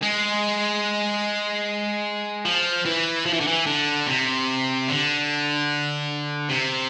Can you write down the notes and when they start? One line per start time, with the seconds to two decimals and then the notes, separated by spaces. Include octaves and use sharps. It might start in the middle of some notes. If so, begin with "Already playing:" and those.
0.02 G#3
2.45 F3
2.85 E3
3.26 F3
3.33 E3
3.40 D3
3.47 E3
3.66 D3
4.07 C3
4.88 D3
6.49 C3